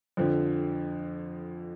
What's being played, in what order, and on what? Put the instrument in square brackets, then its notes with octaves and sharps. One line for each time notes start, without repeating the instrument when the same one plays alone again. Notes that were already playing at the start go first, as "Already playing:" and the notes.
[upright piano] F2 D3 F3